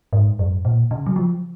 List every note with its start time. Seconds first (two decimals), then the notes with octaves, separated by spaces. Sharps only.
0.13 G#2
0.39 F#2
0.65 A#2
0.91 C#3
1.06 F#3
1.16 F3